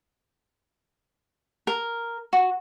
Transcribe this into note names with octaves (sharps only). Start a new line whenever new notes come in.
A#4
F#4